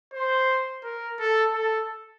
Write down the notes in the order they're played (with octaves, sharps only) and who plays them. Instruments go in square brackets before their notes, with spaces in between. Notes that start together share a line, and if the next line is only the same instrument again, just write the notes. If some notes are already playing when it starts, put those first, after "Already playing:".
[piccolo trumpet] C5
A#4
A4
A4